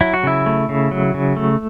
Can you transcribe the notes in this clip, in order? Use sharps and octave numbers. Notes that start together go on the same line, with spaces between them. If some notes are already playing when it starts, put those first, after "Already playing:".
F#3 E4
F#4
C#3 E4
A3
C#3
F#3
C#3
A3